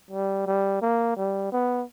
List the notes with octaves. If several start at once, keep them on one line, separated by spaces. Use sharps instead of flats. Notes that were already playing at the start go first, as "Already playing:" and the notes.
G3
G3
A#3
G3
B3